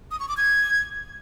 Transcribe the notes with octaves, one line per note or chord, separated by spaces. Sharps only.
D#6
C#6
D6
G#6